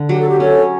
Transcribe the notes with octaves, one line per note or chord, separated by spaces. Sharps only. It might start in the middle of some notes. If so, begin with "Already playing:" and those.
Already playing: D3
F#3 G4
A4
G4
C#4 A4 C#5